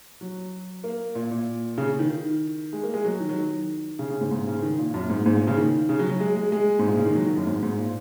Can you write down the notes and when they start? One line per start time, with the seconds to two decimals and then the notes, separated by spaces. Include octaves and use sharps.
0.21 F#3
0.84 A#3
1.15 A#2
1.31 A#2
1.78 C#3
1.99 D#3
2.10 D#3
2.73 G#3
2.83 A#3
2.94 G#3
3.05 F#3
3.20 D#3
3.29 F#3
3.38 D#3
3.99 C#3
4.10 C#3
4.21 G#2
4.31 G#2
4.47 C#3
4.62 D#3
4.79 A#2
4.94 F#2
5.10 G#2
5.26 G#2
5.37 A#2
5.47 C#3
5.57 D#3
5.89 C#3
5.99 F#3
6.09 F#3
6.20 G#3
6.36 G#3
6.52 G#3
6.79 G#2
6.87 A#2
6.97 C#3
7.05 D#3
7.15 F#3
7.26 D#3
7.37 F#2
7.47 G#2
7.63 G#2
7.78 A#2